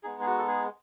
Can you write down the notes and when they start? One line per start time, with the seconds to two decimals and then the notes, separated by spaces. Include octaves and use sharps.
0.03 G#3 B3 D#4 G#4
0.21 G#4
0.26 F#4
0.38 A4
0.48 G#4